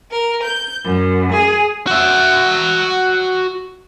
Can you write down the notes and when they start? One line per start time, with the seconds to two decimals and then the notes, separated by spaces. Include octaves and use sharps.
0.11 A#4
0.42 G6
0.83 F#2
1.31 G#4
1.87 F#4 E5